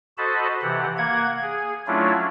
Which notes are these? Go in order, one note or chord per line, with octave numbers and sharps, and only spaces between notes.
F#4 A4 C5 D#5 A5 B5
C3 E3 G4 F#5
A#3 F#5 G#6
G#4
F#3 A3 C#4 D4 E4 F4